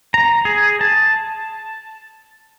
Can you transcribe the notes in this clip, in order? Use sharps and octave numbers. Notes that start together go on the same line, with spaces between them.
A#5
G#4
A5